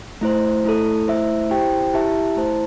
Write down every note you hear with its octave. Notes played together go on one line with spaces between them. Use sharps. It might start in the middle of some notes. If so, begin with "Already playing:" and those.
A3 E4 C5
A3 E4 A4
A3 E4 C5 E5
E4 G4 C5 G5
E4 G4 E5 A5
A3 E4 C5 A5